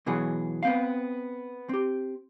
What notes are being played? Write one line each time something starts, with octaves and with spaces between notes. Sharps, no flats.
B2 E3 F#3 G#4
B3 C4 F5
C4 G4